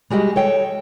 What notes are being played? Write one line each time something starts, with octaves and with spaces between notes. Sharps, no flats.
G3 G#3 F#4 G4 D#5
A4 C#5 G5